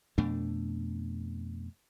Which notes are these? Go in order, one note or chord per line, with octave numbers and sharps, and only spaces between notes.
F2 B2 A3 D4